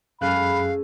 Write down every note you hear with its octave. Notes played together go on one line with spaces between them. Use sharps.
F#2 G#3 A3 C#4 F5 B5 F#6